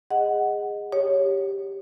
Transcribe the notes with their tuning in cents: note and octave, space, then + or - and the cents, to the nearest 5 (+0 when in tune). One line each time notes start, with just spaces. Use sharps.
G#4 -20 D#5 +0 F#5 +0
G4 +0 C#5 +0